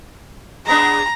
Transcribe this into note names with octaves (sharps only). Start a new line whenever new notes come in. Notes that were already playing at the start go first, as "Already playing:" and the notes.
G#3 B3 D4 A#5